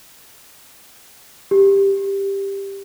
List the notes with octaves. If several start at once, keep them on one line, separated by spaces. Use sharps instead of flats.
G4